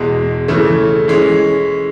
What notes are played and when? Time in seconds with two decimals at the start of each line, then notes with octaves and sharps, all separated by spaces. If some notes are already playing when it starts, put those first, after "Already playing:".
Already playing: E2 B2 G#3
0.48 C#3 E3 A3
1.08 E3 G#3 C#4